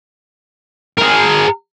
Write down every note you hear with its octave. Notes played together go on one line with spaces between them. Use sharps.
G#4 A#4